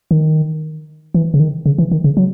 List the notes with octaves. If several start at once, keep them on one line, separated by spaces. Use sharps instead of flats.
D#3
E3
C#3
D#3
C#3
E3
D#3
C#3
F#3